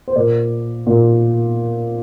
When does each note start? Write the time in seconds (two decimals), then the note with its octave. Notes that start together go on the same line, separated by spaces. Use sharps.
0.08 C5
0.16 A#2 A#4 D5
0.87 A#2